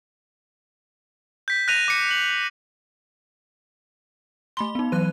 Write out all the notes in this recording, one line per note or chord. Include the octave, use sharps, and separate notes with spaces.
G6 B6
F#6 A#6 D#7 F7
D6 C#7
F#7
A3 B5 C6 G7
B3 D#4
E3 F#3 F#6 D#7